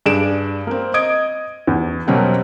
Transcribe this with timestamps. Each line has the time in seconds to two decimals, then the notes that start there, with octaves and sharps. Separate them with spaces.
0.06 G2 D4 G#4 D7 E7
0.67 A#3 C4
0.94 D#5 D#6 G#6 D7
1.67 E2
2.07 B2 F#3 G3 A#3 C4 C#4